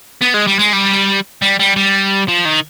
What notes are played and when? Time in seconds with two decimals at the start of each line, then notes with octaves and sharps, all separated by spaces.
0.21 B3
0.34 G#3
0.47 G3
0.59 G#3
0.73 G3
1.42 G3
1.60 G3
1.76 G3
2.28 F3
2.45 D#3